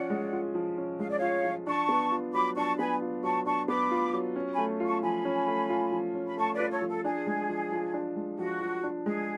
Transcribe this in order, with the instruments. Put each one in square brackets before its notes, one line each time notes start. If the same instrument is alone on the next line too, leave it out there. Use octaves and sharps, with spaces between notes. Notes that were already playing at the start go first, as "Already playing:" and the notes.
Already playing: [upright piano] F3 C#4 F4 [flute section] D5 F#5
[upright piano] G#3
F4
F3
C#4
[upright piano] G#3 [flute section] F5
[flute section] D5
[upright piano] F4 [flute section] C#5 F5
[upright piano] F3
[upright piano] D4 [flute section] A5 C#6
[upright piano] B3
F4
[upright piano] F#3 [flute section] B5 D6
[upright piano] D4 [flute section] A5 C#6
[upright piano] B3 [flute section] G#5 B5
[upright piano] F4
[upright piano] F#3 [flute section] A5 C#6
[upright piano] D4 [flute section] A5 C#6
[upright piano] B3 [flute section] B5 D6
[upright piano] F4
F#3
C#4
[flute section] G#5 B5
[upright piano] A3
F4
[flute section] A5 C#6
[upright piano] F3 [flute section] G#5 B5
[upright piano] C#4
A3
F4
F3
C#4
[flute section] B5
[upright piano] A3 [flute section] A5 C#6
[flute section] B4 D5
[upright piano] F4
[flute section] A4 C#5
[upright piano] F3
[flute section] A4
[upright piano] D4 [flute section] G#4
[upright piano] G#3
F3
F3
D4
G#3
[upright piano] F3 [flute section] F#4
[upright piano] F3
D4
[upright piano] G#3 [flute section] G#4